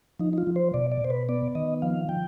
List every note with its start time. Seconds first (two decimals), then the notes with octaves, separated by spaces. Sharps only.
0.20 F3 D#4
0.33 D#4
0.38 F4
0.47 F3
0.56 C5
0.74 B2 D5
0.92 D5
1.01 B2 C5
1.10 B4
1.29 B3 D5
1.55 D#3 D#5
1.82 F3 F5
2.09 F3 G5